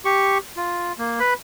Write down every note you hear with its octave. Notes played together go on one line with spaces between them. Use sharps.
G4 C#6
F4
A#3
B4 B5